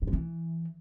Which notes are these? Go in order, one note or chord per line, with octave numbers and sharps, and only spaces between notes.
E3
F3
E3